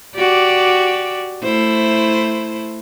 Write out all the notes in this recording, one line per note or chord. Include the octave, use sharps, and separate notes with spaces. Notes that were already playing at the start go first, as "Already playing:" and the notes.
F#4 G4 D5
A3 E4 C5